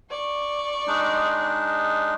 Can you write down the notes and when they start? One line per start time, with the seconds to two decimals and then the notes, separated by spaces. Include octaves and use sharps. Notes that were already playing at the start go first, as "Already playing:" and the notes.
0.10 D5 C#6
0.87 G#3 D4 D#4